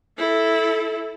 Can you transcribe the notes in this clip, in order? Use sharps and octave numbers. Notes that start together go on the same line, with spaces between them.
E4 A4